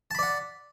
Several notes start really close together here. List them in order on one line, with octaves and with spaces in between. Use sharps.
A5 B5 D5 F#5